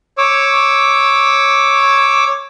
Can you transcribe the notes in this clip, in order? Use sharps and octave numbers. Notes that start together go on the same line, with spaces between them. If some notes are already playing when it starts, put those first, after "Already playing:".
C#5 D6 E6